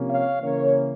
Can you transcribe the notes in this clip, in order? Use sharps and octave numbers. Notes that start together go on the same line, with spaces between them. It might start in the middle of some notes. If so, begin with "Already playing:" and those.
Already playing: C3 F3 A#3 C#4
C#5 F5
C#3 E3 A#3 C#4 A#4 C#5